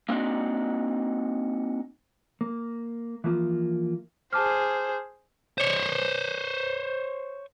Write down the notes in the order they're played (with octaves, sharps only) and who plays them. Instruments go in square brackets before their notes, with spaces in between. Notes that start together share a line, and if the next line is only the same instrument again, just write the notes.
[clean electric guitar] A#3 C4 D4 D#4 F#4
A#3
E3 F3 A#3 F4
[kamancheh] G#4 C5 [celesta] A5 D6 F6
[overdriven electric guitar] C5 C#5